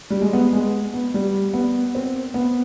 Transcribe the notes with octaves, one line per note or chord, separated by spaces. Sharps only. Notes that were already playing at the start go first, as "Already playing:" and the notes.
G3
G#3
B3
G#3
B3
G3
B3
C4
B3